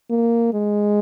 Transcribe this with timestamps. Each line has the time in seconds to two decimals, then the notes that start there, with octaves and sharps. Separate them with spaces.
0.10 A#3
0.54 G#3